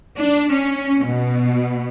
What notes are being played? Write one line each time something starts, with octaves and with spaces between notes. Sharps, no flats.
D4
C#4
B2